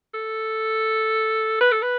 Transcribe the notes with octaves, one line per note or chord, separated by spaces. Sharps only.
A4
B4
A4
B4